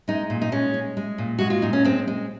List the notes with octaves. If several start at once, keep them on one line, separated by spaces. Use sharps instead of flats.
G#3 D#4
A#2
D#4
G#3 C#4
G#3
G#3
A#2
G#3 F#4
F4
A#2 D#4
C#4
G#3 C4
G#3